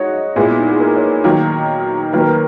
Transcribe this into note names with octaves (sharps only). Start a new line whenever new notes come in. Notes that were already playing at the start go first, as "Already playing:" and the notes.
Already playing: G#3 D#4 F#4 C#5 D#5
D#5
A#2 G#3 B3 E4
D#4
G#4
A#4
C#5
B4
D#3 F#3 A#3
D#3 F#3 A#3 B4
A#4
B4